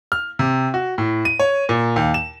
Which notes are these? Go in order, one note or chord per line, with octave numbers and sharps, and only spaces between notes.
F6
C3
F#4
A2
D#7
C#5
A#2
D#2
E7